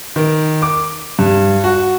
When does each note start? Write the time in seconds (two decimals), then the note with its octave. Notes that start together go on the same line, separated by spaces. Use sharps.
0.16 D#3
0.62 D6
1.19 G2
1.64 F#4